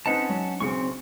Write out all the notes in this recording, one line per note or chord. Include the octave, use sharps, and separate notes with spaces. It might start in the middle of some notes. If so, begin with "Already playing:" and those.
C4 C#4 D#4 B4 F#5 A5
F#3
B1 C#3 C4 C#6 C#7